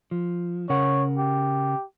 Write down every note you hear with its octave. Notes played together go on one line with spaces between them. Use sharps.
F3
C#3 A#4 C#5 F#5
G4